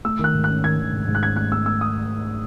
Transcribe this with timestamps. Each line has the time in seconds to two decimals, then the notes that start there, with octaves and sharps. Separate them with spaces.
0.05 A3 E6
0.19 D#3 F#6
0.34 G#2
0.44 F#6
0.49 C#4
0.64 D#3 G#6
0.79 D#3
0.92 G#2
1.08 G#2
1.15 F#6
1.22 C#4 G#6
1.36 A3 F#6
1.52 A3 E6
1.66 A3 E6
1.81 D#6